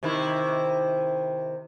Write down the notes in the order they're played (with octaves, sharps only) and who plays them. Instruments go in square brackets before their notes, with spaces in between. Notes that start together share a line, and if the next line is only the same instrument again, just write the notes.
[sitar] C3 D#3 E4